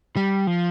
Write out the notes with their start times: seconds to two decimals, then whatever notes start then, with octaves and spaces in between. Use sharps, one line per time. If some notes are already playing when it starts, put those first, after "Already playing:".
0.16 G3
0.47 F3